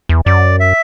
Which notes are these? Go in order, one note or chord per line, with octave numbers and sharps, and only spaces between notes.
E2
F#2 D5
E5